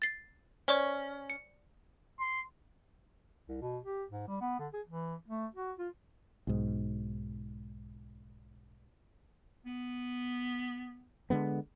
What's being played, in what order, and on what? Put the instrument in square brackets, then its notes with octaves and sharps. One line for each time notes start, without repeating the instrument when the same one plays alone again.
[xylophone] A6 C7
[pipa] C#4 [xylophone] C5 D5 C#6
[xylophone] C#7
[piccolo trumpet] C6
[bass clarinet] C2
B2
G4
G#2
G3
B3
D3
G#4
E3
A3
F#4
F4
[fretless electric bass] B1 G#2
[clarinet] B3
[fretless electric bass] D3 G#3 B3